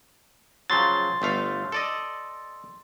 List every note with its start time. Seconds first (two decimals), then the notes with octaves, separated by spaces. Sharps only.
0.70 C#3 F3 F#3 C6 A6
1.22 G1 A3 F5
1.72 A4 D5 D#5